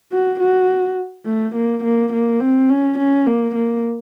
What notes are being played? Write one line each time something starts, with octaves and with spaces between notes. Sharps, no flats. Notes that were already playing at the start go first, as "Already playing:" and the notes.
F#4
F#4
A3
A#3
A#3
A#3
C4
C#4
C#4
A#3
A#3